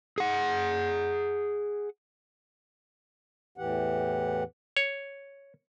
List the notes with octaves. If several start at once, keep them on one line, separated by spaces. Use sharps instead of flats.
G#4 F#5
E2 A2 E3 G4 F#5
C#5